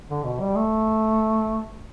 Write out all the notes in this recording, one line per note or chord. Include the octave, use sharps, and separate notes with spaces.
D3
B2
G3
A3